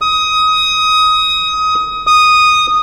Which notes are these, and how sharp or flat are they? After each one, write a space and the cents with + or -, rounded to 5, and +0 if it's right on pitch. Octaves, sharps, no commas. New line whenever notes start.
D#6 +20
D#6 -5